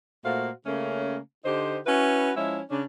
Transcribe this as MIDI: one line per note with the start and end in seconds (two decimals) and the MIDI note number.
0.25 0.50 46
0.25 0.50 57
0.25 0.50 66
0.25 0.50 72
0.25 0.50 77
0.66 1.17 49
0.66 1.17 57
0.66 1.17 58
0.66 1.17 61
1.45 1.79 50
1.45 1.79 63
1.45 1.79 67
1.45 1.79 72
1.87 2.31 61
1.87 2.31 64
1.87 2.31 66
1.87 2.31 71
2.37 2.61 53
2.37 2.61 56
2.37 2.61 61
2.37 2.61 64
2.71 2.84 49
2.71 2.84 61
2.71 2.84 62